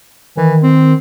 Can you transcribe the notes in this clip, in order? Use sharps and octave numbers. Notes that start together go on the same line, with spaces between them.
D#3 E3
C4